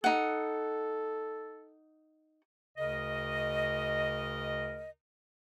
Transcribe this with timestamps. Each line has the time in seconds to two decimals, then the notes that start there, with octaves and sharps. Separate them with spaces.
0.04 D#4 A4 F#5
2.78 D2 C#3 A#4 D#5